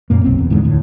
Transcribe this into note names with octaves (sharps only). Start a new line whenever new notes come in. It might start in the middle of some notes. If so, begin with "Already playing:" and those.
F#2 A#2 A#3
F1 B1 C4
E2
E2 G#2 D3
D2 A2